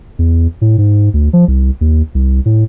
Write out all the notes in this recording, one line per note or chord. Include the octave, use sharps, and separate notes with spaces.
E2
A2
G#2
D2
F3
C2
D#2
C2
A2